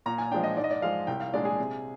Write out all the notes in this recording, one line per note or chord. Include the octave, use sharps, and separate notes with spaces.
A#2 A#5
G#5
F3 G#3 D4 G5
D#5
G#2 D5
D#5
D5
F3 G#3 F5
C2 G5
F5
A#2 G#3 D4 D5
G#4
C3